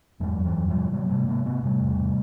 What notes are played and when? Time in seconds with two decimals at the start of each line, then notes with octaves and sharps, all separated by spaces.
0.20 E2 F#3 G#3
0.38 E2
0.44 E3 F#3
0.56 E2
0.68 F3 G3
0.74 C3
0.92 C3 F#3 G#3
1.04 A#3
1.09 C3 G3 A3
1.27 C3 G#3 A#3
1.45 C3 A3 B3
1.63 C3 G3 A3
1.80 E2
1.99 C3